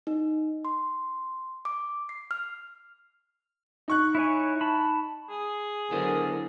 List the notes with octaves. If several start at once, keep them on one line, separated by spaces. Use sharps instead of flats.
D#4
C6
D6
C7
F6
D#4 C#6 F#6
E4 C#5 G#5
A5 B5
G#4
D3 F#3 B3 E4 A#4 C5